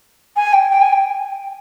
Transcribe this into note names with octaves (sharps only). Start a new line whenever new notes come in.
G#5
G5
G5
G#5
G5